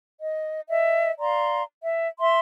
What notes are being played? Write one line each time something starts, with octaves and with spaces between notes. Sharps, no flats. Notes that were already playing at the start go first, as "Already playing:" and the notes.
D#5
D#5 E5
D5 F5 A#5 C6
E5
E5 C6